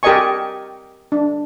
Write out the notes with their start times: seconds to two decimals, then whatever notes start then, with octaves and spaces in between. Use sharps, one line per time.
0.03 G4 A#4 D5 D#5 G#5 C#6
1.12 D4